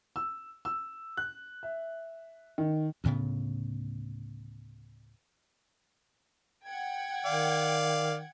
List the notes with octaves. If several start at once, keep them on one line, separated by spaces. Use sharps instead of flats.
E6
E6
F#6
E5
D#3
D2 A2 C#3 B3
F#5 G5 G#6
D#3 D5 F5